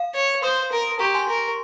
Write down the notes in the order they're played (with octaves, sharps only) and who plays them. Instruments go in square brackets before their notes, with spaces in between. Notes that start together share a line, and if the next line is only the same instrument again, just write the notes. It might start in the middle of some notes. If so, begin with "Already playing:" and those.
Already playing: [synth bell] F5
[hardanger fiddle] C#5
[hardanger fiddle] C5 [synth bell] C6 D#6
[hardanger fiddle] A#4
[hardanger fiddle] G4 [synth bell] A#5 C#6
[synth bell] G#5 C6
[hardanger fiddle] A#4